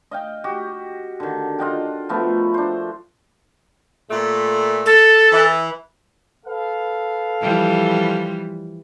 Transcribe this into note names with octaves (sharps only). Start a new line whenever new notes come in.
D#5 F5 G5
F#4 G4
D3 D#3
F4 D#5 F#5 G5
F3 A3 B3 A#4
D4 C5
A#2 A3
A4
E3
A4 B4 F5
E3 F3 G3